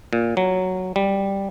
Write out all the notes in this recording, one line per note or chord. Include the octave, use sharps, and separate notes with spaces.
A#2
F#3
G3